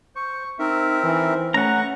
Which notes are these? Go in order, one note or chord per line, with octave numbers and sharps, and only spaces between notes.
C5 C#6
C4 D#4 A#4 E5
E3 C5
A3 C#4 B4 F#5 A#5 C#6